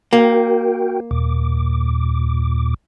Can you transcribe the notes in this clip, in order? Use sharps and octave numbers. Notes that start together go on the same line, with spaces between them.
A#3 F#4 A#4 G5
D#2 A#2 D6